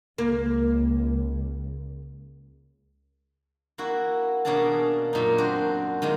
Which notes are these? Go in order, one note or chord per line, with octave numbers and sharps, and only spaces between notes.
C#2 A#3
A#3 E4 F#4
B2 A#3 C#4 D4 G#4 A5
F#2 A#2 D#4
C4 D4 F#4 C5
D#3 G#3 A#3 F4